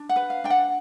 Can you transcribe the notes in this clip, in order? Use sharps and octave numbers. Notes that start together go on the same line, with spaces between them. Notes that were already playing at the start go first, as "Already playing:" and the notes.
Already playing: D4
F#5
B4
F5
D4 G5
F#5